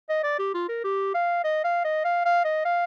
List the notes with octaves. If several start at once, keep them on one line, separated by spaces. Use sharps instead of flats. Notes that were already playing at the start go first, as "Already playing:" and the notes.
D#5
D5
G4
F4
A#4
G4
F5
D#5
F5
D#5
F5
F5
D#5
F5